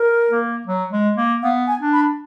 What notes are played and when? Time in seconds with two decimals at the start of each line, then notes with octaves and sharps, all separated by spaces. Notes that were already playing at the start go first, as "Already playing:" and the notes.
Already playing: A#4
0.30 A#3
0.67 F#3
0.92 G#3
1.17 A#3
1.42 B3 F5
1.67 G#5
1.80 D4
1.93 B5